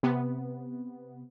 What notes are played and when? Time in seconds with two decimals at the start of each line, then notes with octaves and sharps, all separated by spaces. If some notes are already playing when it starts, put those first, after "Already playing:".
0.03 C3 B3